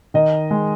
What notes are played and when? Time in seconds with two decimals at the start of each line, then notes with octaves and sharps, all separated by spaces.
0.14 D#3 D#5
0.51 G#3